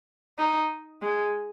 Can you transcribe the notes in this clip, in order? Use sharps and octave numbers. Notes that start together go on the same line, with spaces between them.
D#4
G#3